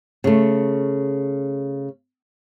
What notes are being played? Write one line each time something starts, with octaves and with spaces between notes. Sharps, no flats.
C#3 A3